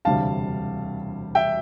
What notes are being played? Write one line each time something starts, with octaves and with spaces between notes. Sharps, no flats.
E1 D2 C3 G3 F5 A5
E5 G5